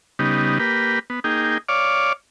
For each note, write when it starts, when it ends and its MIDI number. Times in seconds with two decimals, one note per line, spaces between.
0.19 0.58 49
0.19 0.58 55
0.19 0.58 59
0.19 0.58 63
0.60 0.99 58
0.60 0.99 67
0.60 0.99 71
1.10 1.20 59
1.24 1.58 58
1.24 1.58 63
1.24 1.58 68
1.24 1.58 79
1.69 2.13 73
1.69 2.13 74
1.69 2.13 77
1.69 2.13 86